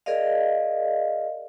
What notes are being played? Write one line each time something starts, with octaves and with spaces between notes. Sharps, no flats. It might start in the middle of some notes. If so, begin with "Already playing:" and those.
G#4 A#4 D5 D#5 F5